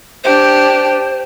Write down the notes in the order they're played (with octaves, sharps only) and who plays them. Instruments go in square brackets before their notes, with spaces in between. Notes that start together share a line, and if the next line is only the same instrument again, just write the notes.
[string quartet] D4 G4 [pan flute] C5